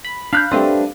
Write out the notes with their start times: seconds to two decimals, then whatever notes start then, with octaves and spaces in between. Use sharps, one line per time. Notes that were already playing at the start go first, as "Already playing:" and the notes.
0.05 B5
0.33 D4 F5 B5 F#6 G6
0.51 G3 A3 C4 D4 B4 F5